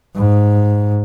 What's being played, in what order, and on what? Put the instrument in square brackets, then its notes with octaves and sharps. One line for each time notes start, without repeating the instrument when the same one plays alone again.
[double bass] G#2